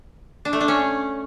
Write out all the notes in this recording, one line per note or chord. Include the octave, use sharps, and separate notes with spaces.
D4
A3
D4
C#4